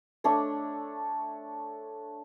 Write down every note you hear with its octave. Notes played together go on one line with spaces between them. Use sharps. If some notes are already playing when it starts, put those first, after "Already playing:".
A3 D4 C#5